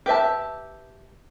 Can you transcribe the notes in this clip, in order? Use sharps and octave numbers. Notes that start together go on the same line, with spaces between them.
G4 B4 E5 A5